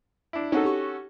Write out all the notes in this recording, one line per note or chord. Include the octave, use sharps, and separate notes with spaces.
D4 E4
C4 C#4 D#4 F#4 A4
G4 C#6